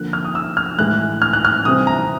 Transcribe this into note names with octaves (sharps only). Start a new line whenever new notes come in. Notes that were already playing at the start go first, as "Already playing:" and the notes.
Already playing: D3 F3 A#3 F#6
F6
D#6
E6
F6
A2 E3 G#3 F#6
F6
F#6
F6
C3 E3 G3 C4 D#6
A#5